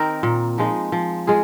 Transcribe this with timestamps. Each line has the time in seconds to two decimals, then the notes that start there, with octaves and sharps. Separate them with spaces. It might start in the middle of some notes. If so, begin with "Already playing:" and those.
Already playing: D#3 C4 D#4 A#4
0.23 A#2
0.58 F3 G#3 D#4
0.92 F3
1.27 G#3 F4 G#4